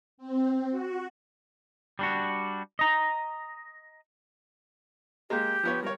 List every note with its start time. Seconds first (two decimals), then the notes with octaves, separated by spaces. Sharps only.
0.18 C4
0.71 F#4
1.99 G3 D4 F#4
2.79 D#5 A#5
5.30 G#3 A#3 G4
5.63 F3 B3 C#5
5.83 G3 A#4 C#5